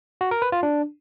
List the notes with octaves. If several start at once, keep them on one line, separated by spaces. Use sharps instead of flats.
F#4
A#4
B4
F4
D4